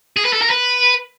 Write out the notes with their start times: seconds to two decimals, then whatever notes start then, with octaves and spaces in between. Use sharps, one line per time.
0.17 G#4
0.25 B4
0.33 A4
0.41 A#4
0.50 B4